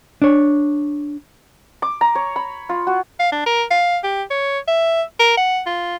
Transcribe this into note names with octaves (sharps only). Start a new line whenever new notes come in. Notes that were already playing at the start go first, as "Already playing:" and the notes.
D4 C#5
D6
A#5
C#5
B5
F4
F#4
F5
D4
A#4
F5
G4
C#5
E5
A#4
F#5
F4